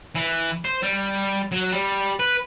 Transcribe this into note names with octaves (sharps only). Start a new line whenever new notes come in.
E3
C5
G3
F#3
G3
B4